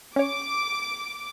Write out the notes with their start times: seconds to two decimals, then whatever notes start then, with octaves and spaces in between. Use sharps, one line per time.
0.16 C#4 C#5 D6